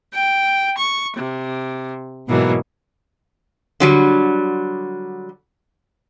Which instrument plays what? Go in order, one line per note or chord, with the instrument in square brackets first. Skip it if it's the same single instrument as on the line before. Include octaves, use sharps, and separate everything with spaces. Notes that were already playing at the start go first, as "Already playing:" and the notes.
[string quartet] G5
C#6
C3
G#2 B2 E3 F#3 A#3
[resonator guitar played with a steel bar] D3 F#3 G3